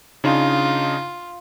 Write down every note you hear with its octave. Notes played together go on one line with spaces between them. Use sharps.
C#3 D4 D#4 F4